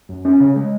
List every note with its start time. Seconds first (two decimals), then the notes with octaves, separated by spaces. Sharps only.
0.09 F#2
0.25 C#4
0.40 C#3
0.56 G#3